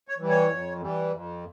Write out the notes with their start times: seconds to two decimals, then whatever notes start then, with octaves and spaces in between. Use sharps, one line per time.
0.08 C#5
0.18 E3 G3
0.29 C#5
0.50 F2
0.81 E3 G3
1.13 F2